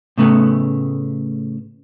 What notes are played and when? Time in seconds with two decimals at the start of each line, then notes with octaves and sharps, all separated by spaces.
0.18 A2 C#3 A3 B3